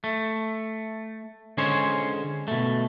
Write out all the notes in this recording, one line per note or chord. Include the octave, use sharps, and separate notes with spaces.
A3
D3 G#3 C#4 G#4 C5 C#5
B2 A3